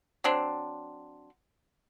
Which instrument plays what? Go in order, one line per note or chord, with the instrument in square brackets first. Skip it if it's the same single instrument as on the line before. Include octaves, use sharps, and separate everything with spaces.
[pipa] F#3 C4 D4